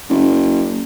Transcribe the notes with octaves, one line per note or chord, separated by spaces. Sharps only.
F#1